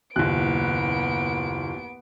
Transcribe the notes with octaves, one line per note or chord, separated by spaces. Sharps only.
F#1 D#2 A#2 B3 F#6 D7